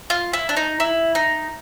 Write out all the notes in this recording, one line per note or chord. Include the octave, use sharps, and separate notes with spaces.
F4
E4
D4
D#4
E4
D#4